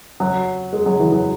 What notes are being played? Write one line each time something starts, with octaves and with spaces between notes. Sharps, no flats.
F#3
G#3
F#3
E3
F#3